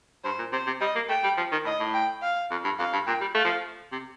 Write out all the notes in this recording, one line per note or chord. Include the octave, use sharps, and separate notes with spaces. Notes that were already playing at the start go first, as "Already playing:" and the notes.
G2 C5
A#2
C3 C5
C3
G3 D#5
A#3
A3 G5
G3
F3
D#3
A2 D#5
A2
G5
F5
F2
G2
F2 F5
G2
A#2 G5
G3
A3 F5
F3
C3